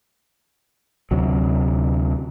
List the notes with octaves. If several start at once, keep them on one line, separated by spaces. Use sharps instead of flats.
D2 C3 F#3